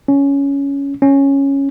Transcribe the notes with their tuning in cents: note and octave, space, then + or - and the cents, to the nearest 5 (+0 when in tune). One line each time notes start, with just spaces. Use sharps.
C#4 +10
C#4 -5